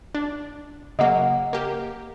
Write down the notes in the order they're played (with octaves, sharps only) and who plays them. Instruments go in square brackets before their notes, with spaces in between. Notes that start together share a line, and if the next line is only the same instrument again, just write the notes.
[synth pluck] D4
[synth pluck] C#3 F#3 A#3 [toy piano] D#5 F#5
[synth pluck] A#3 G4